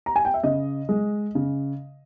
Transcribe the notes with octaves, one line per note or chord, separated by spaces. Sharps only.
A#5
G#5
G5
E5
C#3 D#5
G#3
C#3